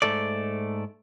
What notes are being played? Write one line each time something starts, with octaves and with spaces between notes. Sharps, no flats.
G#2 A3 A4 D5